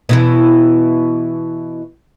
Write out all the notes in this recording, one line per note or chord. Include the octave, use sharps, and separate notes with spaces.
B2 E3 E4